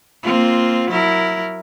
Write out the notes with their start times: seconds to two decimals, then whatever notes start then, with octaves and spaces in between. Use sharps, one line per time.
0.23 A#3 C4 F4
0.90 F#3 E4 A#4